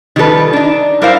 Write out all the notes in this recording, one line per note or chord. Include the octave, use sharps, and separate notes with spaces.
D#3 F3 G3 G#4 A4 B4
D4 D#4
G3 E4 A#4 C5 F5